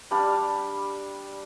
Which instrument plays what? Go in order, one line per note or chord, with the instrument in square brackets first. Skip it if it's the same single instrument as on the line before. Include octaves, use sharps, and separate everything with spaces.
[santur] G3 D4 F5